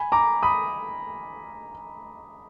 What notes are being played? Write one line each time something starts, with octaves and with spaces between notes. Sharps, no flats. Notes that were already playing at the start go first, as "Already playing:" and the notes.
Already playing: G#5 B5
A#5 D6
B5 D#6